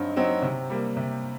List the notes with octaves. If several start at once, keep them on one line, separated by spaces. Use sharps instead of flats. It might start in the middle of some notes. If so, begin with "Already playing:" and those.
Already playing: G2 F#3 C4 D#4
F#3 C4 D#4
C3
G3 A#3
C3